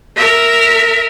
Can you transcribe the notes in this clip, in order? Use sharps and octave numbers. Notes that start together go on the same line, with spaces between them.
A#4 E5